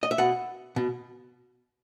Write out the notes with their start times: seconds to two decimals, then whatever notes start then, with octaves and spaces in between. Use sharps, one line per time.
0.03 D#5
0.11 E5
0.18 B2 F#5
0.76 B2